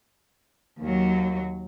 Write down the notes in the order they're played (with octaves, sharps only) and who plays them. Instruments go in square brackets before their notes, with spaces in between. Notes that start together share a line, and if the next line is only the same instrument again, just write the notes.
[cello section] D#2 F#3